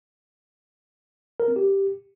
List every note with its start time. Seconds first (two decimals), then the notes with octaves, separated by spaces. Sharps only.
1.40 A#4
1.48 C4
1.56 G4